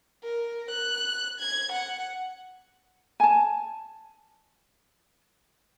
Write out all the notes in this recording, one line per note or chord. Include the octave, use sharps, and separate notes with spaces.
A#4
F#6
G#6
F#5
G#5 A5